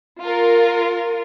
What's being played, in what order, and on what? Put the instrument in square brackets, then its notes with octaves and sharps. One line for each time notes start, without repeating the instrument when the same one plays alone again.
[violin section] F4 A#4